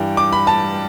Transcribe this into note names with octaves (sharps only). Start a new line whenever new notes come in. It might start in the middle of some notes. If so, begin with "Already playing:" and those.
Already playing: G2 E3 G3 G5
D6
B5
A5